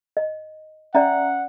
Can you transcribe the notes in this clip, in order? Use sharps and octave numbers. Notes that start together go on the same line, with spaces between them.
D#5
C#4 D5 E5 F#5 A#5